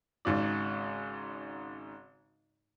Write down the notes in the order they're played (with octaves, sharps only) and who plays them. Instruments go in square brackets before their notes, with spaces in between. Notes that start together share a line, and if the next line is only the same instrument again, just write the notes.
[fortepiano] G#1 G#2 C#3 F#4 D5